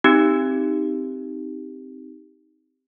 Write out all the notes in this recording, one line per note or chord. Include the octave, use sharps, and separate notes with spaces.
C4 D#4 G4